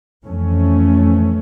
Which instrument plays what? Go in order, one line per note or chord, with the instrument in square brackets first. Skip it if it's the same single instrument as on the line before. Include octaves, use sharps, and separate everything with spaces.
[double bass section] F2 E3 A3 C#4